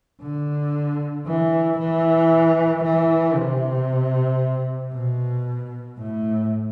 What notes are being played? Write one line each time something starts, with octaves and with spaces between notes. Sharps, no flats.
D3
E3
E3
E3
C3
B2
A2